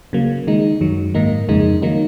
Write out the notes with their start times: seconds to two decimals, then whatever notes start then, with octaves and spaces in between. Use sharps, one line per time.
0.13 C#3 F#3 A#3
0.47 D#3 G#3 D#4
0.81 F#2 D#3 F#3
1.14 G#2 D#3 A#3 D#4
1.49 F2 C#3 G#3 D#4
1.82 D#3 F#3 A#3 D#4